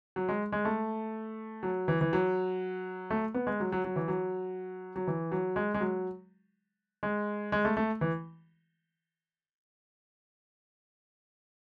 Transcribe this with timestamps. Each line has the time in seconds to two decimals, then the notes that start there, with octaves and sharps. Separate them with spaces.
0.16 F#3
0.29 G#3
0.52 G#3
0.65 A3
1.63 F#3
1.88 E3
2.01 E3
2.13 F#3
3.10 A3
3.34 B3
3.47 G#3
3.60 F#3
3.72 F#3
3.84 F#3
3.96 E3
4.08 F#3
4.96 F#3
5.07 E3
5.32 F#3
5.56 G#3
5.74 G#3
5.81 F#3
7.03 G#3
7.52 G#3
7.65 A3
7.77 A3
8.01 E3